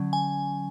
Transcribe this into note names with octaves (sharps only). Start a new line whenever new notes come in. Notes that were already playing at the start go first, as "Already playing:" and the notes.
Already playing: D3 F#3 C#4
G#5